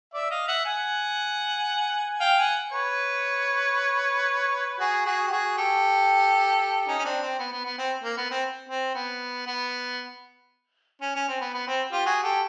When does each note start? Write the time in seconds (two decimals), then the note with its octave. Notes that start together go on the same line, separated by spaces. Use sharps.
0.14 D5 E5
0.30 D#5 F5
0.48 E5 F#5
0.65 F#5 G#5
2.20 F5 G5
2.38 F#5 G#5
2.72 B4 C#5
4.80 F#4 G#4
5.06 F#4 G#4
5.27 G4
5.31 F#4 G#4
5.57 G4 A4
6.88 C#4 D#4
6.99 C#4
7.05 C4 D4
7.22 C4
7.39 B3
7.53 B3
7.65 B3
7.78 C4
8.04 A#3
8.17 B3
8.30 C4
8.69 C4
8.95 B3
9.46 B3
11.02 C#4
11.16 C#4
11.28 C4
11.41 B3
11.54 B3
11.68 C4
11.92 F4 G4
12.06 F#4 G#4
12.23 G4 A4